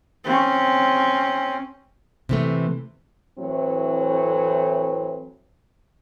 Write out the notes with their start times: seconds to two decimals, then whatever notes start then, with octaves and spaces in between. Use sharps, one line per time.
0.24 C4 C#4
2.29 C3 E3 A3
3.39 A2 E3 F#3 A3 C4